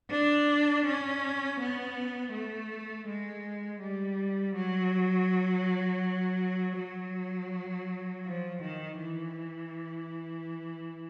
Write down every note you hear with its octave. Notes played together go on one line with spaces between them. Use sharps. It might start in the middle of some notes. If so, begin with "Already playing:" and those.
D4
C#4
B3
A3
G#3
G3
F#3
F#3
F3
D#3
E3